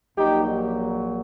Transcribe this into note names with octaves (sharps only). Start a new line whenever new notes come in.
A#1 A#2 F#3 D#4 G4